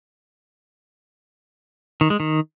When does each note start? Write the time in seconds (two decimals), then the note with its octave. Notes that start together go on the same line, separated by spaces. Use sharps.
2.01 D#3
2.10 G#3
2.20 D#3